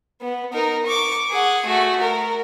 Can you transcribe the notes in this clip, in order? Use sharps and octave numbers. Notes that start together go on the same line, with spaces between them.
B3
D#4 A#4
C#6 D6
G#4 F#5
A3 F#4
A#4